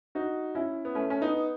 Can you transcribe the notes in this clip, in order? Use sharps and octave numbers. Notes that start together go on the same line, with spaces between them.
D#4 F#4
C#4 E4
B3
A3 C#4
C#4
B3 D#4